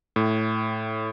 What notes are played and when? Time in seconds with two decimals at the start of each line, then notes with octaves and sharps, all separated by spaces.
0.16 A2